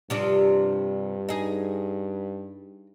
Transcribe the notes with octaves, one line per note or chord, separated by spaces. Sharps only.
G2 C3 F3 D4
D#4 G#4